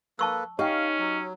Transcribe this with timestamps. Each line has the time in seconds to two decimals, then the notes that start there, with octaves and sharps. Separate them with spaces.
0.19 A#3 A4 B4 A5 C#6 E6
0.59 C#4 D#4 G4 F5 G5
0.99 F#3